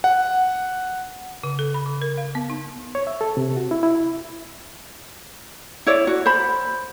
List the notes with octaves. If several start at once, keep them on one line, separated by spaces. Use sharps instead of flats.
F#5
C#3
A4
B5
C#3
A#4
F5
B3
D#4
C#5
E5
A4
C3
F#4
E4
E4
E4 C#5 D5
F#4
C5 B5